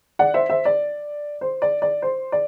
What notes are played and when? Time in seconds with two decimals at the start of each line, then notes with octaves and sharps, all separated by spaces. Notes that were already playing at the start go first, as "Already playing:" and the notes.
0.19 D5 F#5
0.34 C5 E5
0.49 C5 E5
0.65 D5
1.41 C5
1.62 D5
1.82 D5
2.02 C5
2.32 D5